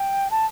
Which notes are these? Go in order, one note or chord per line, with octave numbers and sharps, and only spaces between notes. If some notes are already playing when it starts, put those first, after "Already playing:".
Already playing: G5
A5